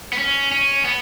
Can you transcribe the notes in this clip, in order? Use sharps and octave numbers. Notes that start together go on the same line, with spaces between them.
B3
C#4
C#4
B3